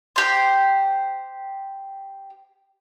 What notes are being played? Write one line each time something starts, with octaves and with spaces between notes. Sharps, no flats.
G4 C5